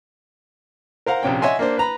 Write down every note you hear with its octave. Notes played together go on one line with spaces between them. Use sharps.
A#4 C5 F5 F#5 A#5
A#1 C3 C#4 G5
C#5 D#5 E5 F#5 G#5 C6
A#3 D4 C5
B4 A#5 B5